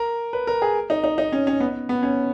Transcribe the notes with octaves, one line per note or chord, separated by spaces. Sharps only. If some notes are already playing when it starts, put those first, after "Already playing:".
Already playing: A#4
B4
A#4
G#4
D#4
D#4
D#4
C#4
C#4
B3
B3
C#4